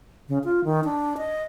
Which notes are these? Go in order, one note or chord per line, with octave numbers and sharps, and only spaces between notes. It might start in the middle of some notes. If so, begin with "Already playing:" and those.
C#3
F4
D#3
D4
D#5